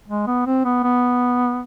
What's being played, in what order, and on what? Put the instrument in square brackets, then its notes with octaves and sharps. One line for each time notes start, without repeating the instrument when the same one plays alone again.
[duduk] G#3
B3
C4
B3
B3